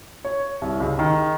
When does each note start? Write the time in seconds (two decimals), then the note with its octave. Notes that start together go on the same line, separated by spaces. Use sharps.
0.25 C#5
0.62 C2
0.80 C#2
0.99 D#3